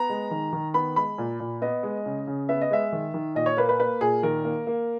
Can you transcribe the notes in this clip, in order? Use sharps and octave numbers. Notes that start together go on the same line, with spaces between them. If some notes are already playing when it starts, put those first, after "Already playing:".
Already playing: B3 A#5
G#3
D#3
D#3
B3 B5
G#3 B5
A#2
A#2
B3 D#5
G#3
C#3
C#3
B3 E5
D#5
G#3 E5
D#3
D#3
A#2 D#5
C#5
A#3 B4
B4
A#3 B4
A#2 G#4
D#3 A#4
A#3
A#3